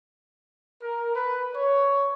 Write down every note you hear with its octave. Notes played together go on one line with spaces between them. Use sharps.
A#4
B4
C#5